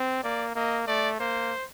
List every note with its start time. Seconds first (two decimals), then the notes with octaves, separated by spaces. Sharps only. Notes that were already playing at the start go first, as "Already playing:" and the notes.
Already playing: C4
0.23 A#3 D5
0.55 A#3 D#5
0.87 A3 D5
1.20 A#3 C5